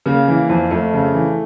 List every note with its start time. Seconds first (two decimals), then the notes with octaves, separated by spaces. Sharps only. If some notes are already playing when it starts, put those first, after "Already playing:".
0.06 C#3 A#3
0.28 E3
0.49 F2
0.71 F2 A3
0.94 C#3
1.14 E3